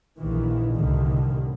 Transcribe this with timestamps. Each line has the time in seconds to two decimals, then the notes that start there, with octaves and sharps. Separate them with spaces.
0.16 A#1 D#3 E3
0.73 C2 A2 D3 D#3